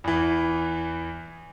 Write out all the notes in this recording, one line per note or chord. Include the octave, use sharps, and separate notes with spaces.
E2 E3